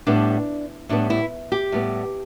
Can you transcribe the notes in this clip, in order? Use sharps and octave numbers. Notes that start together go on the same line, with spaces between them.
A2 G3 B3 D4
A2 G3 B3 D4
E4
G4
A2 G3 B3